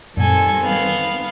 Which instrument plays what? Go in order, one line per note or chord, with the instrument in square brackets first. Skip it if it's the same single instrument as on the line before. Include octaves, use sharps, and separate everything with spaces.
[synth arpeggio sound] F#2 A#2 [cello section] D#3 G3 C4 [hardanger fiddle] A4 G#5
[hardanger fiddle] B3 F5